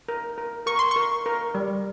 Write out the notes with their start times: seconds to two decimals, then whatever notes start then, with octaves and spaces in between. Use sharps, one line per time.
0.08 A#4
0.38 A#4
0.67 A#4 C#6
0.79 C6
0.91 A#4 C#6
1.26 A#4
1.55 G3